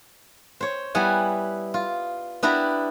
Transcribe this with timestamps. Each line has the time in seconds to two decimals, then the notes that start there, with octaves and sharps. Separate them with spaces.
0.61 C5 C#5
0.95 G3 B3 E4 F#5 G#5
1.74 F4
2.43 B3 D4 E4 G4 A#5